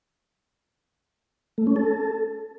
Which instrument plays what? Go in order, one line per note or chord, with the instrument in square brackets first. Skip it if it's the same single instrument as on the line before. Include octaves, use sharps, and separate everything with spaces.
[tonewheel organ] A3
C#4
A4